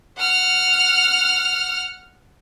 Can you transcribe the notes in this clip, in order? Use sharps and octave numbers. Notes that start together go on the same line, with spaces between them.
F#5 F6